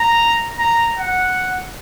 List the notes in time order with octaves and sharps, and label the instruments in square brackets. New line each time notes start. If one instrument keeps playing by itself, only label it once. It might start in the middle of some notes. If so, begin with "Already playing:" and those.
Already playing: [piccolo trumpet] A#5
A#5
F#5